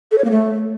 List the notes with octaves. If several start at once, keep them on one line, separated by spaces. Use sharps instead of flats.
A4
C#5
A#3
A3